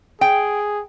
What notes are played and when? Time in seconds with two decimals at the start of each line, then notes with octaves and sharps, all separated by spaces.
0.21 G#4 G5